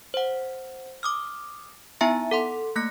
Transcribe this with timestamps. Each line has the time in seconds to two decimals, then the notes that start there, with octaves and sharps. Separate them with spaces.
0.14 C5 F#5
1.03 D6 D#6 F6
2.01 B3 D#4 E4 E5 G#5 A#5
2.31 A4 F#5 C6
2.76 A3 A#3 F#6 A#6 C#7